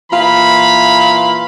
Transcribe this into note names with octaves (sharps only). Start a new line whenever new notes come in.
A#2 E3 F5 B5